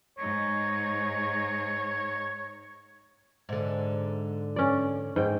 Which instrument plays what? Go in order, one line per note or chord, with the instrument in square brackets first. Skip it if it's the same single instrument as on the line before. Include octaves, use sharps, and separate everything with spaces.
[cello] G#2 D#4 [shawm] C#5
[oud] G#2 D3
[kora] C#4 D5
G#2 D#5 G5